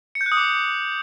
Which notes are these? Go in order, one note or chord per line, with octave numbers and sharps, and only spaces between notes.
C#7
G6
F#6
D#6
D6